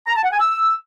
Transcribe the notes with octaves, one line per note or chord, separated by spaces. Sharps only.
A#5
A5
F#5
G#5
E6